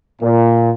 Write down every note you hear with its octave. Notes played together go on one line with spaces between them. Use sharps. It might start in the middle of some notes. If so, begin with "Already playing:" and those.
A#2